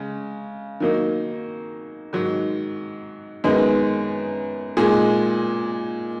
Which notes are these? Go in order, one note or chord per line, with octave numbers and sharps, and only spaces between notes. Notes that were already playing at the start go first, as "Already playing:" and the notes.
Already playing: C#3 G#3
D#3 F#3 A#3 D#4
G#2 D#3 F#3
F#2 D#3 G#3 B3 D#4
A#2 G#3 D#4 G#4